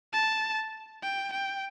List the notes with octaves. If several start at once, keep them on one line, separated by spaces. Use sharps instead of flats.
A5
G5
G5